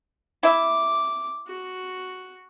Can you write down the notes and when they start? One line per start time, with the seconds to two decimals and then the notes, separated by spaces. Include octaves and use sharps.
0.43 E4 E5 D6
1.47 F#4